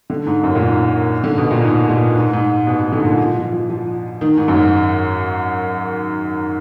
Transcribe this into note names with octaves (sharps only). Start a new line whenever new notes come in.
D3
G#2
F#2
A#2
G#2
D3
B2
A#2
G#2
A#2
G#2
G#2
B2
B2
D3
G#2
A#2
F3
F3
F3
F3
D#3
G#2
F#2
G#2